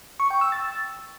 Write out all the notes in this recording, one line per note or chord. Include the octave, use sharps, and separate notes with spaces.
C#6
G5
E6
A6